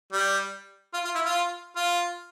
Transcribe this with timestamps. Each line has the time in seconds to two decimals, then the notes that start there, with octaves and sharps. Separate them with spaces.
0.12 G3
0.94 F4
1.05 F4
1.15 E4
1.25 F4
1.76 F4